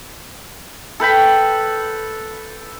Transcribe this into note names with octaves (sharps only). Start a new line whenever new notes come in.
A4 B4 G5 B5